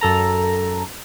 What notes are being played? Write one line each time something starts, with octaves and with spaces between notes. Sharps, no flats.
F#2 A4 A#5